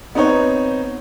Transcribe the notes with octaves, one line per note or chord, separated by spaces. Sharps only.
B3 C4 D#4 C#5